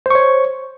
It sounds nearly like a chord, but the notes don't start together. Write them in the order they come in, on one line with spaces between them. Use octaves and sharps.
C5 C#6 C#5